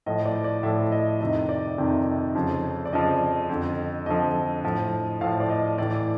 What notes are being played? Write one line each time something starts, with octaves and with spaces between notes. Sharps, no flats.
A2 F3 D#5
D5
D5
A2 F3 E5
D#5
F2 C3 D#3 D#5
D5
F2 C3 D#3
F2 C#3 F3
D5
F2 C#3 F3 D#5
F2 D3 F3
F2 D3 F3 D#5
A2 F3
A2 F3 F5
D5
D#5
A2 E3 D5